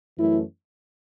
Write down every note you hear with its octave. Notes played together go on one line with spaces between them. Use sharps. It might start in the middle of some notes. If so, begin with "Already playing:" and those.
F#2 E3 A3 C#4 E4